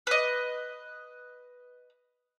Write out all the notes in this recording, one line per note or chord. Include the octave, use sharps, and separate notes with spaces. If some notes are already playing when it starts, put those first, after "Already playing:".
B4 D#5